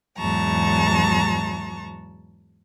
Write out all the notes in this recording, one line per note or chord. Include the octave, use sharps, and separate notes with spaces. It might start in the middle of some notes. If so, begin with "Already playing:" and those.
E2 G#2 F#3 A5 A#5 C#6